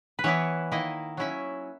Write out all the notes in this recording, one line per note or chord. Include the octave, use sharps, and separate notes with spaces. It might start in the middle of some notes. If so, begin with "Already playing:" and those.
B4
E3 B3 E4 C#5
D#3 A#3 E4 D#5
F#3 C#4 E4 E5